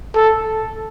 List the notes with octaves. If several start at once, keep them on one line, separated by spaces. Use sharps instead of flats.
A4